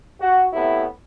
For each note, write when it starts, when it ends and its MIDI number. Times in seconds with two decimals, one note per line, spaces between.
0.21 0.46 66
0.53 0.86 45
0.53 0.86 48
0.53 0.86 59
0.53 0.86 64